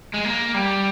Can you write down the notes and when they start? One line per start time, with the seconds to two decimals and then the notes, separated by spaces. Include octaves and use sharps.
0.14 G#3
0.25 A#3
0.55 G3